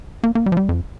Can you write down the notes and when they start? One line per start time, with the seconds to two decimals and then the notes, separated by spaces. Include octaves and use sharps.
0.24 A#3
0.35 A#3
0.46 G3
0.52 F3
0.57 G3
0.69 F2